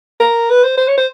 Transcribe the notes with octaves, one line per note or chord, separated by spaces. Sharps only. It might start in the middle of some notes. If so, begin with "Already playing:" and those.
A#4
B4
C5
C5
C#5
C5